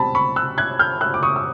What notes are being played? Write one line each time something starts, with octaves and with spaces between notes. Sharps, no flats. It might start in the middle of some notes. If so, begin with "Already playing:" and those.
Already playing: B2 G3 C4 A5 B5
B5 C#6
E6 F#6
F#6 G#6
F6 G6
E6 F#6
D6
C#6 D#6
E6